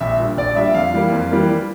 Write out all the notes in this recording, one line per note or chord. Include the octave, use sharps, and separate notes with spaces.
A#1 E5
A#2 G3 D4
A#1 D5
A#2 G3 D4 E5
F2 F5
E3 G3 A#3
F2
E3 G3 A#3